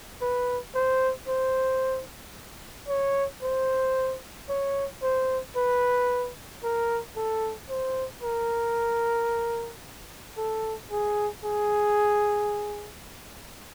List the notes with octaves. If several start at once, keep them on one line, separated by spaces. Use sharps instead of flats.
B4
C5
C5
C#5
C5
C#5
C5
B4
A#4
A4
C5
A#4
A4
G#4
G#4